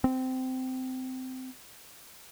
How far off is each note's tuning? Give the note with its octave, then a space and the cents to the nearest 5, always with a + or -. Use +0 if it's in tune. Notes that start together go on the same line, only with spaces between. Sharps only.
C4 -20